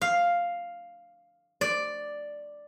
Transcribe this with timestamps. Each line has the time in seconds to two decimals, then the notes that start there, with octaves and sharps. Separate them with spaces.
0.01 F5
1.61 D5